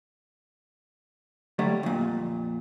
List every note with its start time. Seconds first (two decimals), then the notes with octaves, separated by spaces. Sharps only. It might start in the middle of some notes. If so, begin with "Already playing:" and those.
1.59 D3 F#3 G3 A3
1.83 F2 A#2